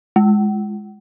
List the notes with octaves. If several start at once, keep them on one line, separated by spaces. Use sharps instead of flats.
G#3